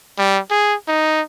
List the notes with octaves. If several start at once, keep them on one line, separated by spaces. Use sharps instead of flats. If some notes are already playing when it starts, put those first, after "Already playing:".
G3
G#4
D#4